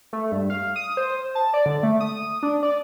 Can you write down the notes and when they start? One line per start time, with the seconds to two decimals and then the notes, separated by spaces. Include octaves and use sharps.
0.13 A3
0.32 G2
0.50 F5
0.76 D#6
0.97 C5
1.35 A5
1.54 D5
1.66 D3
1.83 A3
2.01 D#6
2.43 D4
2.63 D5